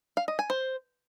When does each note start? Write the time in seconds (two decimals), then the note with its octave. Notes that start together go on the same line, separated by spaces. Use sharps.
0.17 F5
0.28 D#5
0.39 G#5
0.50 C5